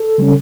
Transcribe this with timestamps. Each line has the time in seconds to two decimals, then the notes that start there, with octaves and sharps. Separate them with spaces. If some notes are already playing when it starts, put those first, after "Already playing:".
Already playing: A4
0.18 C#3 G3 C#4